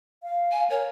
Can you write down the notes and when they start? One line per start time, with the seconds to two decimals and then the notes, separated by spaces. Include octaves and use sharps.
0.23 F5
0.51 G#5
0.70 A#4 C#5